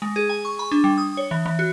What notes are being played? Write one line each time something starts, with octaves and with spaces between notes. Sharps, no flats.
G#3
G#4
G#5
C#6
B5
D4
G3
D#6
C#5
E3
E3
F#4